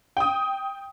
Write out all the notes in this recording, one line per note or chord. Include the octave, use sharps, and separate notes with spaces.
G5 D#6